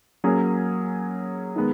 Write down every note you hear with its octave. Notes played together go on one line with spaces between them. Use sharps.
F#3 A#3 C#4 G#4
D#3 G#3 B3